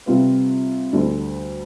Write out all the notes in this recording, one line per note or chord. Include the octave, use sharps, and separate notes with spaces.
C3 G3 C4 F4 B4
D2 D3 G3